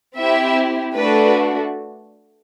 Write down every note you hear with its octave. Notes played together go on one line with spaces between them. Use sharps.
C4 E4 G4 E5
A3 D4 F#4 B4